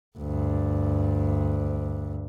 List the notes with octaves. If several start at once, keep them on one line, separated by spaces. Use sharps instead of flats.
D2 G2